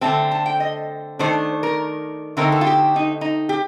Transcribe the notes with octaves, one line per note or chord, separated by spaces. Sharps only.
D3 A3 C4 A5
A5
G5
D#5
D#3 A3 D4 C5
A#4
D3 A3 C4 D#4 A#4
A4
F4
G4
D#4
D#4
G4